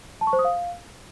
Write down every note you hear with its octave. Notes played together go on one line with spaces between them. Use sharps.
A5
C#6
C5
D#6
F5